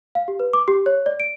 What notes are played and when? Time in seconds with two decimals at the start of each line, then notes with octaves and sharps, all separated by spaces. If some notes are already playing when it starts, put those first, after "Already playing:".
0.15 F5
0.28 G4
0.40 B4
0.53 D6
0.68 G4
0.86 C#5
1.06 D5
1.20 D7